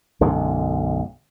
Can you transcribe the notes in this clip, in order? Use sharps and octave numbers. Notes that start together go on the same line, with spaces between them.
B1 F#2 D3 G#3